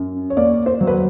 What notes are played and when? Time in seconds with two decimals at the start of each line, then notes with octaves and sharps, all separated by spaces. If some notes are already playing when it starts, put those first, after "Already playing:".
Already playing: F#2
0.30 C#5
0.37 A#3 D5
0.66 C5
0.81 F#3
0.87 B4